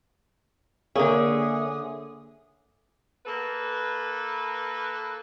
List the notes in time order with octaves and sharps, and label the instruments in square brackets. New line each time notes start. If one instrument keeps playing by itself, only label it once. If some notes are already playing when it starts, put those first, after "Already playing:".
[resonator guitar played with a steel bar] D3 G#4 [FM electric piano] A#3 C#5 E5
[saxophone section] A#3 A4 B4